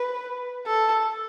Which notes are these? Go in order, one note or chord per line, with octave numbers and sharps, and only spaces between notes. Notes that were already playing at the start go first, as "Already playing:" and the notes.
Already playing: B4
A4